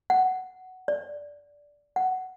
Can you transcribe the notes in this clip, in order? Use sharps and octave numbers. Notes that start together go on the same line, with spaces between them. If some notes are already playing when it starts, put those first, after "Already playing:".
F#5
D5
F#5